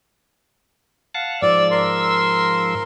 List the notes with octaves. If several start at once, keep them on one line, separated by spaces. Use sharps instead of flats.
F5 F#5 A5
G#2 F3 D5 E6
A#4 C6